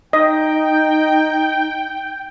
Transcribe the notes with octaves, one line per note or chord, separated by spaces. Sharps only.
D#4 D#5 G5